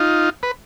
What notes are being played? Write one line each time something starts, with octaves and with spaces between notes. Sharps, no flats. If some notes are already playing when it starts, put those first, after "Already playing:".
Already playing: D#4 F4
B4